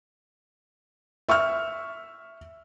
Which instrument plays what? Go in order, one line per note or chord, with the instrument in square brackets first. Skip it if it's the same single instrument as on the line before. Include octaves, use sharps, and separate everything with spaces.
[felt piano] E5 C#6 E6 F6